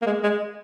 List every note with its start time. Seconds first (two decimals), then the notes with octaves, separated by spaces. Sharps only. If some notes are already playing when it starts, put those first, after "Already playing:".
0.02 A#3
0.06 G#3
0.23 G#3